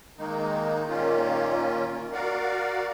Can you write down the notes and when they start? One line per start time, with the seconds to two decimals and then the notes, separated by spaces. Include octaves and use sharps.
0.18 D#3 G#3 A#3 D#4
0.88 A#2 D#3 A#3 C#4 F4
2.12 F#4 A#4 D5 F5 F#5